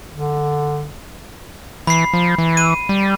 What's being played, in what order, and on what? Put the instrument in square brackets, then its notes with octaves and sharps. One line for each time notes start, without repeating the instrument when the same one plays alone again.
[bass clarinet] D3
[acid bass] E3 [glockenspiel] B5 C7
[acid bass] F3
E3
[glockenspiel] D#7
[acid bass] G3